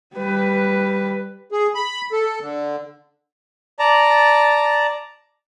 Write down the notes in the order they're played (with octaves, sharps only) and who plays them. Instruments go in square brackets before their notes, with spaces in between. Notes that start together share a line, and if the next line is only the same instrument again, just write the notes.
[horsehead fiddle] G3 B4
[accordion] G#4
B5
A4
D3
[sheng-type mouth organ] D5 A5 A#5